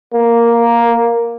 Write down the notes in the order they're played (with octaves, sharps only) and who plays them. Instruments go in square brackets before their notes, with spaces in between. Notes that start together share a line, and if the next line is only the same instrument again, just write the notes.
[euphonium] A#3